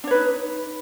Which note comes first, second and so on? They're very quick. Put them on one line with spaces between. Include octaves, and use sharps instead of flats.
D4 C#5 B4 D#4